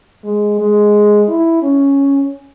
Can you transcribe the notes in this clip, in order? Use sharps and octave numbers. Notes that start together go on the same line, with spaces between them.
G#3
G#3
E4
C#4